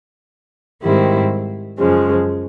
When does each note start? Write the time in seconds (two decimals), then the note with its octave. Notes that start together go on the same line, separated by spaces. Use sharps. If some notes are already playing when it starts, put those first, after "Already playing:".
0.83 G#2 D#3 G3 C4 E4
1.79 F#2 C#3 F3 G#3